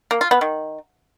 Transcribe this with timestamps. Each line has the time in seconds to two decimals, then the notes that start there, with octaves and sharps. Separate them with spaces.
0.11 A#3
0.21 F4
0.31 B3
0.41 D#3